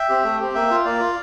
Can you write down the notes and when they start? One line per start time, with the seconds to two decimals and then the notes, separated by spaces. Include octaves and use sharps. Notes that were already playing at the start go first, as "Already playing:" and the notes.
Already playing: E5 G5
0.09 C4 G4
0.24 A3
0.40 C4 G4
0.54 A#3 E5 G5
0.71 F4
0.85 A#3 D5 F5
1.00 F4